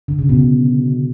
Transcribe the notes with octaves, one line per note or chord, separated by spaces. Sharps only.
D3
C#3
B2
D3